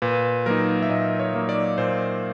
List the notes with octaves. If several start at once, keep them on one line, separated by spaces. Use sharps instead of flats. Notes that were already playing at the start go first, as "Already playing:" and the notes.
A#2 B4
F#3 A#3 D#4 A#4
E5
A#2 D#5
C#5
F#3 A#3 D#4
D5
A#2 C5